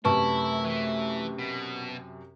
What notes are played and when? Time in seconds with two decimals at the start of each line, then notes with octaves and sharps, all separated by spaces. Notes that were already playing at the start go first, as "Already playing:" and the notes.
0.05 F#2 C3 A3 E4 B4 A5 C#6
0.65 E3
1.39 B2